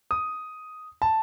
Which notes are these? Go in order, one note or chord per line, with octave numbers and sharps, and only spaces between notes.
D#6
A5